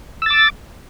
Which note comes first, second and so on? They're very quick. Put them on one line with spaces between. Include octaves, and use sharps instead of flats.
E6 A6 D6